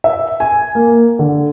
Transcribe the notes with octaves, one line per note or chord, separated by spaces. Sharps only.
E5
G#5
A#3
D3